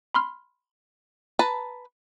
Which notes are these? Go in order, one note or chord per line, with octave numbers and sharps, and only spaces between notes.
B5 C6 F6
B4 A5 A#5